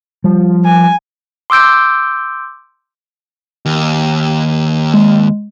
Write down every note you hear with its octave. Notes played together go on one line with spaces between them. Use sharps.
F3 G3
G#5
C6 D6 E6 G6 D7
D#2
G#3